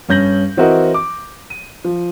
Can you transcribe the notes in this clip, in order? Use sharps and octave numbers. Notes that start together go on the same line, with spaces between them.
G2 C#4 G6 A#6 F#7
E3 C4 E4 F#4 A#4 D#5
D6
D#7
F3